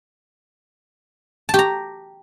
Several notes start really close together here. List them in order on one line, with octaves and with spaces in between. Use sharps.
A5 G4 A#5